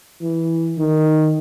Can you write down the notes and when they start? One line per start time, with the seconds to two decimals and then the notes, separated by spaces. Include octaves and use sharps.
0.22 E3
0.78 D#3